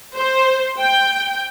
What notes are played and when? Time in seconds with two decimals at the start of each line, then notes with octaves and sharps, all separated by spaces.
0.16 C5
0.79 G5